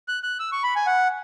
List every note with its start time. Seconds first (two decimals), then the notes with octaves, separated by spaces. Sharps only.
0.08 F#6
0.23 F#6
0.40 E6
0.52 C#6
0.63 B5
0.76 G#5
0.86 F#5